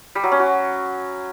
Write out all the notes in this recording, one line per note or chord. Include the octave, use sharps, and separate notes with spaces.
G3
F#3
C#4
F#4